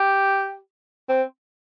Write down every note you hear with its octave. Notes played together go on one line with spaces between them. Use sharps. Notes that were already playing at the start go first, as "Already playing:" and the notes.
Already playing: G4
C4